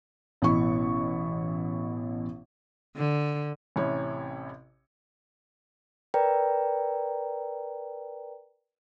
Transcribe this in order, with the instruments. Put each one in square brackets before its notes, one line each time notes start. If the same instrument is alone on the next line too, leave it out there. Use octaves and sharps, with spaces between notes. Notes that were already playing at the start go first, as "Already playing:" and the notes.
[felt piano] A1 B2 E4 C#6
[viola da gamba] D3
[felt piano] A1 C3 C#4 E4 C#5
[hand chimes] A#4 B4 D5 G5 A#5